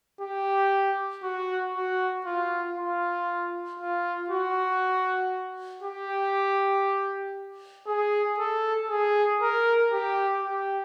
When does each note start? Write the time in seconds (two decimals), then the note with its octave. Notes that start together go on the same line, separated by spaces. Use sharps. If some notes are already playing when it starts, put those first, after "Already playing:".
0.21 G4
1.23 F#4
1.75 F#4
2.25 F4
2.77 F4
3.79 F4
4.30 F#4
5.83 G4
7.87 G#4
8.38 A4
8.90 G#4
9.41 A#4
9.92 G4
10.43 G4